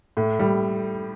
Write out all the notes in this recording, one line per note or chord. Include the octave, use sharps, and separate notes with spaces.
A2
G3